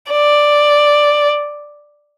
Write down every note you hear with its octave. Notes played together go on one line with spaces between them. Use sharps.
D5